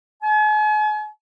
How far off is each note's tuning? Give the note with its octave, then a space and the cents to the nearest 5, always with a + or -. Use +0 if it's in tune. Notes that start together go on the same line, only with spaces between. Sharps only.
G#5 +40